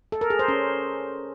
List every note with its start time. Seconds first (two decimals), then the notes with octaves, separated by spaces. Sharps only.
0.12 A4
0.21 A#4
0.30 G#4
0.39 C5
0.48 C#4